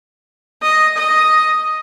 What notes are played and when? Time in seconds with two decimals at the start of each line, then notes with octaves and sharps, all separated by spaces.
0.63 D#5
0.97 D#5